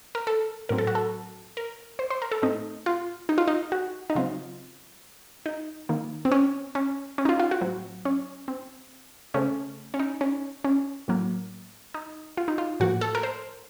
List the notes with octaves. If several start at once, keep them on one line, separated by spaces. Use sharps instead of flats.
A#4
A4
A2 F#3 C4 A#4
A4
F#4
A4
A#4
C5
C5
A#4
A4
A2 A3 C4 D#4
F4
D#4
F4
D#4
F#4
D#4
C#3 F#3 C4 F4
D#4
D#3 A#3
C4
C#4
C#4
C#4
D#4
F4
F4
F#4
A2 F#3 C4
C#4
C4
C#3 A3 C4 C#4
C#4
D#4
C#4
C#4
A2 F#3 A#3
D#4
F4
D#4
F4
A2 F3 A#3 F#4
A4
A#4
C5